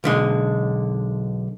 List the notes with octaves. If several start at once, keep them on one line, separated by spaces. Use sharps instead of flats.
B1 D3 G#3